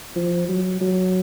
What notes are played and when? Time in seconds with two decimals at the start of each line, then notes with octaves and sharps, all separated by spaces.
0.16 F3
0.49 F#3
0.81 F#3